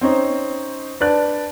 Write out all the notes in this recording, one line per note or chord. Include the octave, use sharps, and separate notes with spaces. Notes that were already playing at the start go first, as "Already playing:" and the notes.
C4 C#4 D#4 C5
D4 B4 D5 A5 F#6